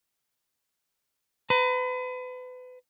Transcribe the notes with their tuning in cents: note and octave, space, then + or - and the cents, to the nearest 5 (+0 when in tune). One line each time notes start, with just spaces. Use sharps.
B4 +35 A#5 +0